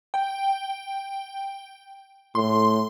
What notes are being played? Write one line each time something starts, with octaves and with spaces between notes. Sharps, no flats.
G5
A2 C6